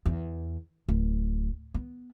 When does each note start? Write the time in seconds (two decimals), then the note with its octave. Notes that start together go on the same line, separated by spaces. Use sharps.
0.06 E2
0.89 D1
1.74 B3